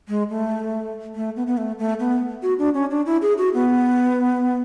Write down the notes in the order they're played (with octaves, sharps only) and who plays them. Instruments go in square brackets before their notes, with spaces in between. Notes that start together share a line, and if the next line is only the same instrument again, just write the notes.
[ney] G#3
A3
A3
B3
B3
A3
A3
B3
F#4
D4
C#4
D4
E4
G#4
F#4
B3